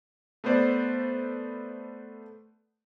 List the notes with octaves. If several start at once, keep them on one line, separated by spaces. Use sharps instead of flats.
A3 B3 B4 C5 D5